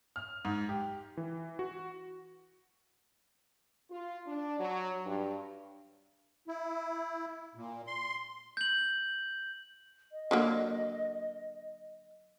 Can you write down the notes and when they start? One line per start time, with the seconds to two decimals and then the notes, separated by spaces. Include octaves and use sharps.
0.16 F6
0.45 G#2
0.69 G4
1.17 E3
1.59 F#4
3.91 F4
4.27 D4
4.59 F#3
5.06 G2
6.47 E4
7.55 A#2
7.87 C6
8.57 G6 F#7
10.12 D#5
10.31 D3 F#3 A#3